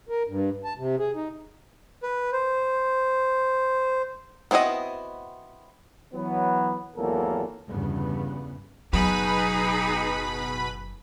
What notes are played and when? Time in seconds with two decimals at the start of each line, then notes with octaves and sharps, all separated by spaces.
0.09 A#4
0.28 G2
0.64 A5
0.78 C3
0.98 G#4
1.15 D#4
2.03 B4
2.32 C5
4.51 B3 C4 E4 F#4 D#5
6.14 E3 F#3 B3
6.97 G#1 E2 F#3 A#3 A4 A#4
7.69 G1 E2 G2 C#3 B3
8.93 F#1 B2 F#3 D#4 G#4 B4 B5